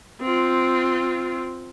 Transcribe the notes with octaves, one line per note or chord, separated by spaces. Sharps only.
C4 F4